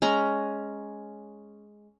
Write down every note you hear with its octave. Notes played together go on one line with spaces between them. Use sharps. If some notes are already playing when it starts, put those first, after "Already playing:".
G#3 C#4 A#5